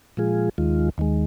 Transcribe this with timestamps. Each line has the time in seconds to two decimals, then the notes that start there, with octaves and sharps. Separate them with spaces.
0.17 A#2 F3 G#3 F4 G#4
0.58 D#2 D#3 G#3 F4
0.98 D#2 D#3 G#3